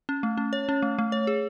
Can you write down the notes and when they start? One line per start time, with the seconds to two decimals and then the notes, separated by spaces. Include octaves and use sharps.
0.09 C#4
0.23 A3
0.37 C#4
0.53 C#5
0.69 C#4
0.82 A3
0.99 A3
1.12 C#5
1.27 G#4